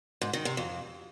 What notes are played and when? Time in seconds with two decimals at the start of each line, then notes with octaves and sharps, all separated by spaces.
0.21 G#2
0.33 D#3
0.45 C3
0.57 F2